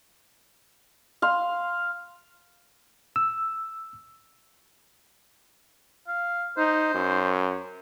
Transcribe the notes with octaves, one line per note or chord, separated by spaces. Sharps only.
F5 C6
E6
F5
D#4 C5
F#2